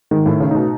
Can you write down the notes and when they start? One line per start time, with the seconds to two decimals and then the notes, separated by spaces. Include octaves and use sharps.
0.11 G#2 D#3
0.26 A2 A3
0.40 C#3
0.51 B2 D#4